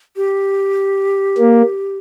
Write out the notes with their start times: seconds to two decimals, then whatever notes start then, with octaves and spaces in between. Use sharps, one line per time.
0.16 G4
1.38 A#3